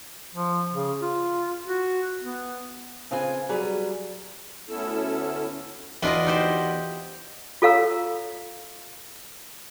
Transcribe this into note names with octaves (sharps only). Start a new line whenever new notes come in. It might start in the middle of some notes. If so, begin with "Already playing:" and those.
F3
C#3
F4
F#4
B3
C#3 C4 F4 B4 G#5
F#3 G3 G#4 B4
D2 B3 C#4 E4 A4 E6
E2 B2 D4 F4 D#5
D#4 G4 C5
F4 A4 C#5 F5 A#5 E6